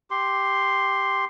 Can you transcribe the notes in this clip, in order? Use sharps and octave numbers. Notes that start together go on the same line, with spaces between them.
G4 C6